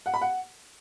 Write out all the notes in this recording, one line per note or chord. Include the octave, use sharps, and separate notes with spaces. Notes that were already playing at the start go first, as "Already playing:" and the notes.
F#5
B5
F#5